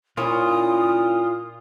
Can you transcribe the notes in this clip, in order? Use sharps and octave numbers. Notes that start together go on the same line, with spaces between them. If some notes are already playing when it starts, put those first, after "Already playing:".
A#2 A#3 C#4 E4 F4 D#6